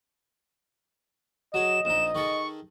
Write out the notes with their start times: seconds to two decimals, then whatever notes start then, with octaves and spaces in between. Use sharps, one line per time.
1.54 F#3 G#4 D#5 E7
1.85 A#1 D#4 E7
2.15 D#3 G#4 A4 C#6